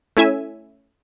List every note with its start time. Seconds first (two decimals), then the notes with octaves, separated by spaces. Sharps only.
0.17 A3 C#4 E4 E5 G#5